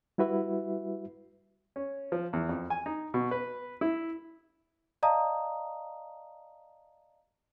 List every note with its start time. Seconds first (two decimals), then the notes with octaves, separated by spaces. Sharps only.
0.18 G3 E4 F#4 B4 E5
1.76 C#4
2.12 F3
2.33 E2
2.49 F2
2.70 G#5
2.86 D#4
3.14 B2
3.31 B4
3.81 E4
5.03 D5 D#5 F5 A5 A#5 D#6